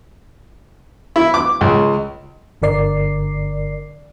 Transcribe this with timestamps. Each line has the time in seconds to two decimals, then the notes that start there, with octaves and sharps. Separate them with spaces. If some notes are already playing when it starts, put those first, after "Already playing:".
1.16 E4
1.34 D6
1.61 C#2
2.62 G1 D3 A#4 D5 C7